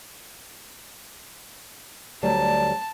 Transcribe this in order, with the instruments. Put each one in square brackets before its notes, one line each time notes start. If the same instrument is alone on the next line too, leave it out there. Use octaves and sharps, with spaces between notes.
[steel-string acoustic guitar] D2 F#3 G3 [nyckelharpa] A5